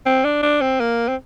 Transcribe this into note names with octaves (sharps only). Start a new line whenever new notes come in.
C4
D4
D4
C4
A#3
C4